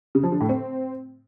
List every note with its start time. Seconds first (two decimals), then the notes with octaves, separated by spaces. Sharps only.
0.15 C#3
0.23 F3
0.32 D3
0.41 A2
0.49 C4